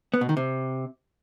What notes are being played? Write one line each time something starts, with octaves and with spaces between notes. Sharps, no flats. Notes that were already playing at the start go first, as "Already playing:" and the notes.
B3
B2
D#3
C3